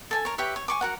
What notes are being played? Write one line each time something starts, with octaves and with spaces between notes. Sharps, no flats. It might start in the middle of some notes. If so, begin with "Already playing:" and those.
A4 G#5 A5
A#4 C#5
G4 B4 C#5 E5
C#5
G#5 C#6 D6
F#4 A#4 F#5